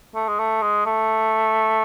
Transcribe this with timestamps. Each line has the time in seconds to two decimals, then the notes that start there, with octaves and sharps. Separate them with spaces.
0.15 A3
0.28 G#3
0.39 A3
0.62 G#3
0.86 A3